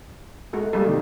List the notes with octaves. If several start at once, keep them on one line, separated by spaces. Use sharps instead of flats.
G#3 A3 F#4
G3 G#3 A#3 A4
C3 D#3 G4